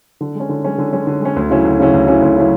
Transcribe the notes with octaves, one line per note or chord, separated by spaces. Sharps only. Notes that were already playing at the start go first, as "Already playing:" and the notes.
D3
G#3
C#4
D3
G#3 C#4
D3
G#3 C#4
D3
G#3 C#4
D2
C#3 F#3 C#4 E4
D2
C#3 F#3 C#4 E4
D2
C#3 F#3 C#4 E4
D2
C#3 F#3 C#4 E4